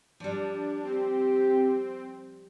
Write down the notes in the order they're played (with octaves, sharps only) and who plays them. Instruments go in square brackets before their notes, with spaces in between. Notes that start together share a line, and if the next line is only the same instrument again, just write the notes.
[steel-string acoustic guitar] F3 G3 [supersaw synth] D4
[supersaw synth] C4 [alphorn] G4